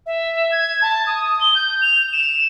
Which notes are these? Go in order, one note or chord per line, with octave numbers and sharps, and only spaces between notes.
E5
G#6
A5
D#6
G7
G6
F7
E7